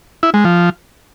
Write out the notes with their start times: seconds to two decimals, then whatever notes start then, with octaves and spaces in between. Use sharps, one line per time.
0.23 E4
0.34 G#3
0.45 F3